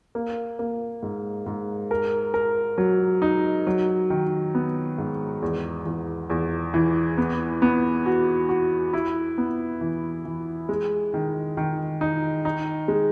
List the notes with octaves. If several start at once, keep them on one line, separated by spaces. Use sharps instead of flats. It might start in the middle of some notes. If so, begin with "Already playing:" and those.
A#3
A#3
G#2
G#2
A#4
A#4
F#3
D#4
F#3
D#3
B3
G#2
E2
E2
E2
E3
B3
B3
F#4
F#4
E4
B3
E3
E3
G#3
D#3
D#3
D#4
D#4
G#3